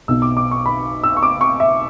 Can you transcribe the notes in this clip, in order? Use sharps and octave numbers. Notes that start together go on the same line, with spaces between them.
B1 B2 E6
D6
D6
C#6
B5
E6
C#6
D6
C#6
E5